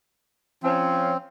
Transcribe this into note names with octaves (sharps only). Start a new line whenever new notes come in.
F3 C4 C#4